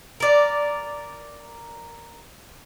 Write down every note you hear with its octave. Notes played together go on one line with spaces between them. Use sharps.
A#4 D5